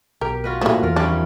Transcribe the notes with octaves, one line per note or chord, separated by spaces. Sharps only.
B1 G4 A#4
F4 F#4 B4
G2 A#2 E3 F3 A3 F#4
E2 F4 A#4
F#2 D#3 F3 G3 C#4 D4